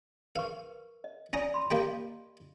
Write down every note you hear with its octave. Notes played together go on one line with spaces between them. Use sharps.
A#4 B4 F5 C#6
D#5
C#4 D5 G#5 A#5 D#6
B5 C6
A#3 G4 D#5 G5